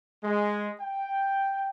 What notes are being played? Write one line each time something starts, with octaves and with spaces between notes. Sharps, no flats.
G#3
G5